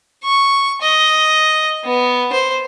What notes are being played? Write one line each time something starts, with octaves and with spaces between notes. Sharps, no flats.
C#6
D#5
B3
C5